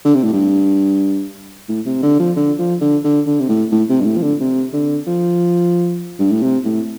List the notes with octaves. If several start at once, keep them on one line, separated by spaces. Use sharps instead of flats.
D3
C3
A2
G2
A2
C3
D3
F3
D3
F3
D3
D3
D3
C3
A2
A2
C3
G2
A2
F3
D3
C3
D3
F3
G2
A2
C3
A2